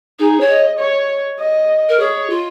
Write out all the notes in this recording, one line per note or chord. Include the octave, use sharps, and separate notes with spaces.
D#4 G#4
C#5
D#5
C#5
D#5
A#4
G#4 C#5
F4